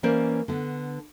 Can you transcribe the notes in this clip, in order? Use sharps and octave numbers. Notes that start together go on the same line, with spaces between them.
E3 A#3 C#4 A#4 C5 D5
D3 B3